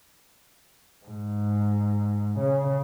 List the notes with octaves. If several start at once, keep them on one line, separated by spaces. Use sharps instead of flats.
G#2
C#3